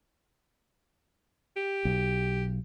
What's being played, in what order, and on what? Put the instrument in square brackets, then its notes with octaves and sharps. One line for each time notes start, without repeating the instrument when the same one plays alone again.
[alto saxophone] G4
[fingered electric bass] B1